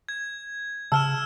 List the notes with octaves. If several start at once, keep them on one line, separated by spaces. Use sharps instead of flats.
G#6
C#3 A5 E6 F6 E7